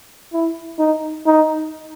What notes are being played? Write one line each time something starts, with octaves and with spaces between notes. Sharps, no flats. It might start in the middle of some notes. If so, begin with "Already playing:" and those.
E4
D#4
D#4